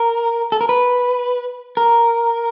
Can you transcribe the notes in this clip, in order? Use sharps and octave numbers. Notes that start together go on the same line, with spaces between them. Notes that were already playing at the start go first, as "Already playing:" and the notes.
Already playing: A#4
A4
A#4
B4
A#4